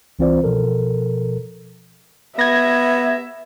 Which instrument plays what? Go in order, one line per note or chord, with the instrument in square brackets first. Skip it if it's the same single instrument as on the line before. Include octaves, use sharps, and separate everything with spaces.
[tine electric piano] C2 E3 C4 F4 C5 D5
B2 F3 A4 A#4
[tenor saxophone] B3 [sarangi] E5 [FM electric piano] G#6 A#6